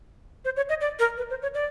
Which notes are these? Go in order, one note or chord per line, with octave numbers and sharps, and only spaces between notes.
C5
C#5
D#5
D5
A#4
B4
C5
C#5
D5